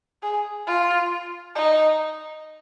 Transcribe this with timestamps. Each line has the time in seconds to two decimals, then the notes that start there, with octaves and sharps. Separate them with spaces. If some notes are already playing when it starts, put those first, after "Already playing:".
0.23 G#4
0.67 F4
1.56 D#4